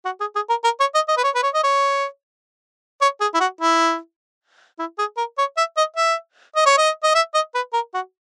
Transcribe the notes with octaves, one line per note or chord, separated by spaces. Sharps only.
F#4
G#4
G#4
A#4
A#4
C#5
D#5
D#5
B4
C#5
B4
C#5
D#5
C#5
C#5
G#4
E4
F#4
E4
E4
G#4
A#4
C#5
E5
D#5
E5
D#5
C#5
D#5
D#5
E5
D#5
B4
A#4
F#4